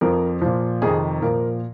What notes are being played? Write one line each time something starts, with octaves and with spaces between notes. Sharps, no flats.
F2 F3 A#4
A#2 F3
F2 C3 D#3 G#4
A#2 F3 A#4